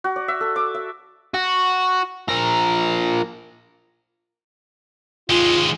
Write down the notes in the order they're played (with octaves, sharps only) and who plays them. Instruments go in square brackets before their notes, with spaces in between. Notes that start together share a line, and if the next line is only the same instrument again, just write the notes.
[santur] F#4
D5
E5
A4
D6
E5
[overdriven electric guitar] F#4
F3 A#4
[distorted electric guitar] D#2 G#3 [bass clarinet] F4